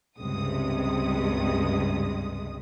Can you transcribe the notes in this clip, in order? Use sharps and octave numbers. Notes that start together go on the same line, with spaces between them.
C#2 G2 C3 G#3 D#6